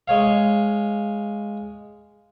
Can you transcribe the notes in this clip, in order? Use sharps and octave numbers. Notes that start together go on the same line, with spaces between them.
G#3 C#5 F5